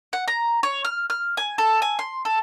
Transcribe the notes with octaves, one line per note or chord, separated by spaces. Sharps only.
F#5
A#5
C#5
F6
F6
G#5
A4
G#5
C6
A4